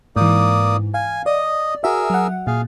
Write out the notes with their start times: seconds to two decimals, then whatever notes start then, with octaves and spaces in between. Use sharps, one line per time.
0.16 G#2 E3 A#3 D5 D#6
0.94 F5 G#5
1.26 D5 D#5 D#6
1.84 F#4 G#4 A#4 E5 E6
2.10 F#3 F#5
2.47 A#2 G#4 F5